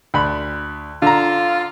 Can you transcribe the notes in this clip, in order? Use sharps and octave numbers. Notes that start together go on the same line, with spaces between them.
D2 B5
D3 F4 A#5